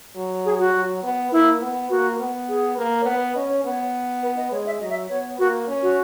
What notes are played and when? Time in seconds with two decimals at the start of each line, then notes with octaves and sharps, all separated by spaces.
0.16 F#3
0.45 G#4
0.59 F#4
0.74 F#3
1.03 B3
1.32 A#3 E4
1.61 B3
1.90 A#3 F#4
2.20 B3
2.49 G#4
2.78 A#3
3.01 C#5
3.06 B3 B4
3.35 C#4 D#5
3.50 C#5
3.65 B3
4.22 B4
4.37 D#5
4.52 G#3 C#5
4.66 E5
4.81 F#3 D#5
4.90 E5
5.09 B3 C#5
5.39 A#3 F#4
5.67 C#4
5.82 F#4